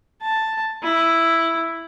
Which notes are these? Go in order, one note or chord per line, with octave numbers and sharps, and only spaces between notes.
A5
E4